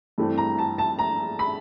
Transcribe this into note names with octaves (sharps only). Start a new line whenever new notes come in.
G2 E3 A3 C4
A#5
A5
A5
A#5
B5